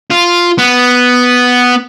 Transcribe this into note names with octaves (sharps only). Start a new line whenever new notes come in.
F4
B3